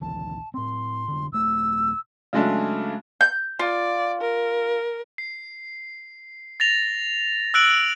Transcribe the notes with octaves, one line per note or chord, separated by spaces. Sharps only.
A#1 D#2 E3 A5
A2 C4 C6
F1 D3
D#1 A3 E6
C#3 F#3 G#3 A3 D4
G6
F4 D5
A#4
C7
A6 A#6 F7
E6 F#6 D7 F#7